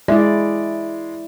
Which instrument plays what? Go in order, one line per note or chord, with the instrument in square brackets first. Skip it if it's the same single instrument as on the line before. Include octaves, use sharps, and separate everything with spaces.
[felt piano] G#3 [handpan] E4 D5 [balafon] G#4 E5